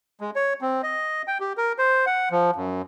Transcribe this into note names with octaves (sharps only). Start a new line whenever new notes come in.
G#3
C#5
C4
D#5
G5
G4
A#4
C5
F#5
F3
F#2